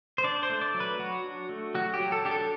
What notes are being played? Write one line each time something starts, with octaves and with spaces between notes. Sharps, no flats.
C5
D4 D5
C5
A3
D5
F#3
B4
F#3 F#4
D4
A3
F#3 F#4
G4
F#3
A4
D4 G4
A4